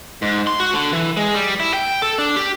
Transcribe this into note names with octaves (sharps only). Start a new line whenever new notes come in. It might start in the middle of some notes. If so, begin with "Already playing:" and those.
G#2
C6
F#4
D3
E3
G#3
G3
E4
G5
A4
D4
G4